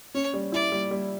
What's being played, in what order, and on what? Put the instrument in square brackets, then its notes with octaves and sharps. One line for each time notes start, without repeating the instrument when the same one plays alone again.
[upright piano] C#4 [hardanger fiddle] C#5
[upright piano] G3
[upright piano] E4 [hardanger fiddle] D5
[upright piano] G3
G3